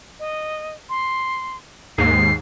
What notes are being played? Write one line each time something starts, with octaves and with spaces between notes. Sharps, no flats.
D#5
C6
D#2 G#2 C7